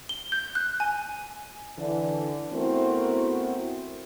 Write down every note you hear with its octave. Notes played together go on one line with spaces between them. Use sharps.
G7
G6
F#6
G#5
D3 E3
A3 B3 C4 E4 F#4 A#4